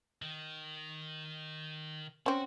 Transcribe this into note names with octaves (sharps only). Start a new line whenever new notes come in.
D#3
C4 C#4 F#4